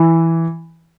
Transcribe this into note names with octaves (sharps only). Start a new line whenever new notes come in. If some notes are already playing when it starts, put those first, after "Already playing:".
Already playing: E3